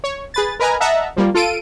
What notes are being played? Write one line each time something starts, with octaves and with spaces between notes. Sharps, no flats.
C#5
G#4 B4 A6
A#4 B4 D#5 G#5 A#5
D#5 E5 F#5 A5 A#5
F3 G3 A#3
F4 A4 D7 D#7